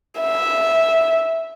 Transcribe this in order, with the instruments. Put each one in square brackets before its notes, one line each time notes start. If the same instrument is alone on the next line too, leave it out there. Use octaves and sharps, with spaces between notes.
[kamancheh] E5